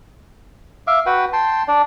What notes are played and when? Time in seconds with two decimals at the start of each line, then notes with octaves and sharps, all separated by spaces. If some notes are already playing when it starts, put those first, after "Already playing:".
0.87 E5 F5 D6
1.06 F#4 B4 F#5 G5
1.33 G5 A5 C6
1.68 D4 D5